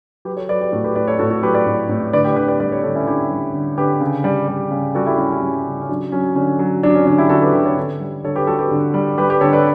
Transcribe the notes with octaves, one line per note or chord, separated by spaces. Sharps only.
F#3 G4 B4
A4 C#5
F#3 B4 D5
G4 B4
A2 F#4 A4
G4 B4
A2 B4 D5
A4 C#5
A2 F#4 A4
F#4 A4
F#3 G4 B4
B4 D5
A2
A2
D3 B4 D5
G4 B4
D3 G4 B4
B4 D5
G3 B4 D5
A4 C#5
D3 A4 C#5
C#4 E4
D3 E4 G4
G3
D3
D3 G4 B4
C#3
G3
G3
C#3
G3 F#4 A4
E4 G4
G3 C#4 E4
C#4
G3
C#3
C#4
F#3 D4
F#3 C#4
D3 C#4
F#3
F#3 D4
C#4
D3 D4
E4 G4
D3 F#4 A4
G4 B4
D3 G4 B4
A4 C#5
D3
G3
D3 A4 C#5
G4 B4
G3 F#4 A4
G4 B4
D3
G3
G3 G4 B4
G4 B4
D3 A4 C#5
B4 D5